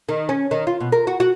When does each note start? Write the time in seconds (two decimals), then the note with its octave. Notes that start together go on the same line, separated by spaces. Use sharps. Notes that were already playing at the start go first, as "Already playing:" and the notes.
0.09 D#3
0.29 C#4
0.51 D#3
0.67 F4
0.80 B2
0.92 A#4
1.07 F#4
1.20 F#4